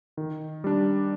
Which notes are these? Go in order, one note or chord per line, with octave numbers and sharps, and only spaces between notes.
D#3
G3 D4